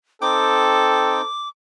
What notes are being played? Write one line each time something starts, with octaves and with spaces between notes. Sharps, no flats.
C4 D#4 A4 G5 D6